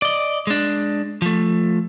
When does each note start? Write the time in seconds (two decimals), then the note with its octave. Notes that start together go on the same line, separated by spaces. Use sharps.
0.02 D5 D#5
0.47 G#3 D4
1.22 F3 A3